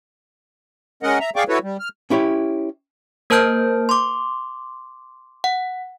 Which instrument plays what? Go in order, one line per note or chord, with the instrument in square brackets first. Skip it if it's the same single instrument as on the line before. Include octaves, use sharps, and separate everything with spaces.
[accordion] G#3 C#4 A#4 D#5 F#5
E5 A#5
G#4 D5 F5 G5 C#6 D6
E4 F#4 A4 B4 C#5
G3
F6
[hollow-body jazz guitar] C#4 E4 G4 C#5
[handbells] A#3 A#4 C5 A5 F6 G6
C6 D6
F#5